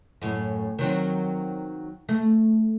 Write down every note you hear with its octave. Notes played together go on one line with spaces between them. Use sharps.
F#2 A2
D#3 F#3 C4
A3